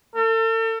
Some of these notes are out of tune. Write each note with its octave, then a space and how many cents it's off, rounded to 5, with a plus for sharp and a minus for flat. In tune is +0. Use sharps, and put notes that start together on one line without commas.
A4 +40